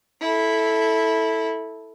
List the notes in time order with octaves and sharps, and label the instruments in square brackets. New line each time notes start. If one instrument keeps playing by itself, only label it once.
[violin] E4 A4